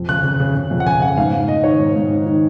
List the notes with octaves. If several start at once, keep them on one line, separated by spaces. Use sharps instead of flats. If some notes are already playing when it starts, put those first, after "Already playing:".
Already playing: F2
C#3 F#6
C#3
C#3
C#3
F2
F#5
C#3 G#5
C#3 F#5
G#2 F5
G#2
G#2 D#5
D#3 C#5
G#2
G#2
D#3
D#3